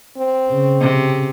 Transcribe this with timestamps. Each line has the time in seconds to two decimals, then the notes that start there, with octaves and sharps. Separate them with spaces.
0.18 C4
0.51 C#3
0.80 C3